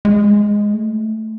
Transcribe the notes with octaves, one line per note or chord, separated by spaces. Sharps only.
G#3
A3